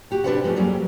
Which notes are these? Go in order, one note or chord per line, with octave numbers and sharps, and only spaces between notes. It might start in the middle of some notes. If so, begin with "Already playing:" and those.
F#4 G4 F#5
C3 D4 B4 C5 E5 F#5
F3 G#3 A3 C#4 F#4
F2 F#3 G3 A#3 G#4 D5